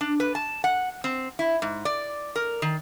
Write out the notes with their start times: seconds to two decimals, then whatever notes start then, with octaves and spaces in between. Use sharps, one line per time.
0.01 D4
0.20 B4
0.35 A5
0.64 F#5
1.04 C4
1.39 E4
1.62 G#2
1.85 D5
2.36 A#4
2.62 D#3